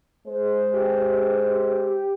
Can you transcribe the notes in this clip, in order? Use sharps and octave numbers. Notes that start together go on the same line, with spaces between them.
G#3 C5
G4